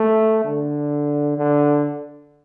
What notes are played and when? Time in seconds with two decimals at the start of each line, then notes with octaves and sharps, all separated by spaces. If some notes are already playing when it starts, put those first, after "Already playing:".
Already playing: A3
0.45 D3
1.38 D3